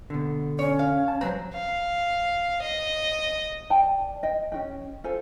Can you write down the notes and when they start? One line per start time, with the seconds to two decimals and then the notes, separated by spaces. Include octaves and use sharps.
0.10 B2 D3
0.59 C#4 C#5
0.79 F5
1.08 A5
1.21 F#3 A3 C4 B4 A#5
1.54 F5
2.62 D#5
3.70 D5 G5 A5
4.23 D#5 G5
4.52 C#4 F#4 G5
5.04 F4 A4 C5 G#5